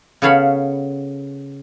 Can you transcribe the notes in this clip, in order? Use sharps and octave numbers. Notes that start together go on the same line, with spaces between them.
C#3 B3 A4 C#5 F5 B5